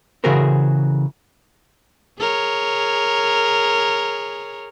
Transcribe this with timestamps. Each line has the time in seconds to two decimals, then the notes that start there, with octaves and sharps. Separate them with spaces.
0.24 C#3 E3 F#4 G#4 A#4 C5
2.18 G#4 A#4 C#5